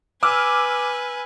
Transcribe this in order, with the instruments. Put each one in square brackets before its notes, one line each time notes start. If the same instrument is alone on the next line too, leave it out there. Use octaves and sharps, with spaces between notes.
[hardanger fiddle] B4 G#5 [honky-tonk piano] D6 E6 F6